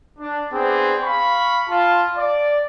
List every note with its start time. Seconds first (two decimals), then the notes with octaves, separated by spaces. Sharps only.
0.19 D4
0.51 B3 C4 D4 G#4
1.03 F5 B5 C#6
1.68 F4 A5
2.16 D5